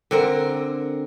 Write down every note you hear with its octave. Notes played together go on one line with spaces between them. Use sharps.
D3 C4 A#4